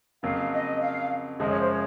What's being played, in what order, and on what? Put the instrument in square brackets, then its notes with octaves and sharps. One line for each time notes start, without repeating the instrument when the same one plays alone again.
[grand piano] F2 C#3 F#3 A#3 [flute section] F5
[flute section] D#5
F5
[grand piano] F#2 C#3 F3 G#3 [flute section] D#5
[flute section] C#5
C5
C#5